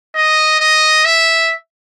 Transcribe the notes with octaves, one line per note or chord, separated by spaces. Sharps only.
D#5
D#5
E5